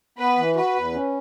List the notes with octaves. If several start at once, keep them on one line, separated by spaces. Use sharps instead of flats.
B3 B4
E3
F#4 B4
E2
C#4